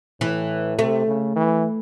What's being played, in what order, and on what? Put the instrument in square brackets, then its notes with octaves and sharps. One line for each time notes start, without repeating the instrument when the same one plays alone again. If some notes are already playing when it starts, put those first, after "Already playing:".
[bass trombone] A2 [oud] E3
[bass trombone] C3 [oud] A3
[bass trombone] C#3
E3